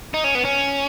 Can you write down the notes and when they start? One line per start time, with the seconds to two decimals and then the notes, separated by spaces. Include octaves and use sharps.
0.14 D#4
0.24 C#4
0.35 B3
0.45 C#4